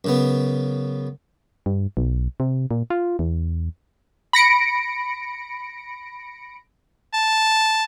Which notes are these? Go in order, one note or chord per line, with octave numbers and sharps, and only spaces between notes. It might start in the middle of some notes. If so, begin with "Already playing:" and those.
F#2 C#3 B3
G2
B1
C3
A#2
F4
E2
B5 A#6 C#7 D7
A5